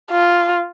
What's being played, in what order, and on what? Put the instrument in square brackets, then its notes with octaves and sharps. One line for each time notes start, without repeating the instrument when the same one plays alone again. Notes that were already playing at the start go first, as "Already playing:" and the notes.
[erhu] F4